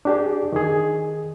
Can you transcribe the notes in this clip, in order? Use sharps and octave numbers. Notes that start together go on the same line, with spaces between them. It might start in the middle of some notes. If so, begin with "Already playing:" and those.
D4 G4 G#4
D#3 G#4